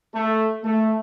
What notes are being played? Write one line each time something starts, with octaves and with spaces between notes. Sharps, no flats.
A3
A3